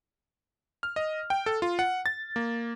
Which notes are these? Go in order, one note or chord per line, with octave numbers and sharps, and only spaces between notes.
F6
D#5
G5
A4
F4
F#5
A6
A#3